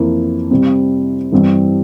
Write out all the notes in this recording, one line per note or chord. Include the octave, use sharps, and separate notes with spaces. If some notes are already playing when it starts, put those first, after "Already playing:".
Already playing: F2 E3 A#3 E4
C3 G3 C4
G2 E3 G3 C4